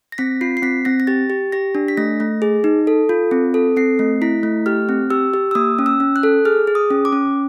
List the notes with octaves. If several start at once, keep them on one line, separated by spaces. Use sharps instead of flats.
A#6
C4 B6
F4 C7
C7
C4 B6
C4 A#6
A#6
G4 A6
G4
G4 A#6
D4
B6
A3 A#6
A3
G#4
D#4
A4
F4
C4
A4
C4 C7
A3
E4 B6
A3
G4 F6
C4
G4 E6
G4
E6
A#3 D#6
C#4
E6
C#4
F#6
A4
G#4 F6
G#4
D#6
C#4
D6
C#4